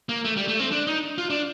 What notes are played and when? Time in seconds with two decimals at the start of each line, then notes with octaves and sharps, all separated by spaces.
0.09 A#3
0.24 A3
0.36 G3
0.48 A3
0.60 C4
0.72 D4
0.87 D#4
1.18 F4
1.30 D4